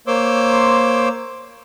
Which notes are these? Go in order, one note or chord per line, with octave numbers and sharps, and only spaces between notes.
A#3 C5 C#5 C6 D6 E6